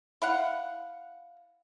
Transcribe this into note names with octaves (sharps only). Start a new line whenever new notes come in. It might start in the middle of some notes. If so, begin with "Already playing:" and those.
E4 F5 F#5